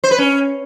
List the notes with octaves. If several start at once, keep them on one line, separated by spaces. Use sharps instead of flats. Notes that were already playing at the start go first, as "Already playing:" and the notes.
C5
B4
C#4